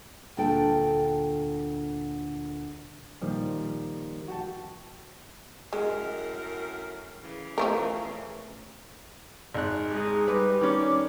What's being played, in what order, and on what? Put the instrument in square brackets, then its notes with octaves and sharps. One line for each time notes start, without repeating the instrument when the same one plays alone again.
[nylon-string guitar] D2 A#2 D4 A4 G5
[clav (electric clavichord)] A#2 D#3 F3 G3
F#4 G5 A5
[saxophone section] F#2 A2 A#4 [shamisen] G#3
[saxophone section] C#3 E3
[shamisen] F3 A3 A#4
[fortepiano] G#1 F#6
[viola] G#3 D#4
[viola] G3 [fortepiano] B4
[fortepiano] D#3 C#4 [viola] D5